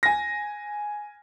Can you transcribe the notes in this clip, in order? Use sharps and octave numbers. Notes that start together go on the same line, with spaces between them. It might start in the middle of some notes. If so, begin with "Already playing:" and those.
G#5 A#6